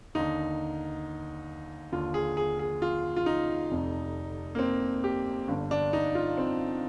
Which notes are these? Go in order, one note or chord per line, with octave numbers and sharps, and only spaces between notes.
D#2 D3 D#4
D#2 D3 F4
G#4
G#4
G#4
F4
F4
D#4
F1 F2 C3
A#3
C4
G4
G1 G2 D3
D4
D#4
F4
C4